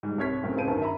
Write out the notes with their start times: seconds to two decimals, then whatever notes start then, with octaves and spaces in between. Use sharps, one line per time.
0.03 G#2 G3
0.18 C2 C3 C#5 F6 G#6 B6
0.43 F#1 A2 C4 C#4
0.56 C#2 C#3 B4 C5 A5 D#7
0.68 G1 F#2 D#3 A5
0.82 E5 A#5 B5